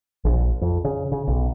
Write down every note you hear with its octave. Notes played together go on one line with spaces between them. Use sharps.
A#1
F2
C#3
C#3
B1